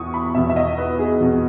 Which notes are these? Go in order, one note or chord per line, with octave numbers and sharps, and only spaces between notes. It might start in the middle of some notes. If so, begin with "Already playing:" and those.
Already playing: E2 B2 C#6 D#6
B5
E2 B2 E5
E5
D#5
B4
G#4
E2 B2 F#4